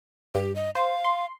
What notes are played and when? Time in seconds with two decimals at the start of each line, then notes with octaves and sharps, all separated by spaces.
0.35 G2 G4
0.56 D#5
0.75 C5 F5
1.04 C6